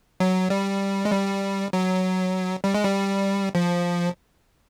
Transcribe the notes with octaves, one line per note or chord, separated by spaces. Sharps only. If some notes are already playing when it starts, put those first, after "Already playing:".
F#3
G3
G#3
G3
F#3
G3
G#3
G3
F3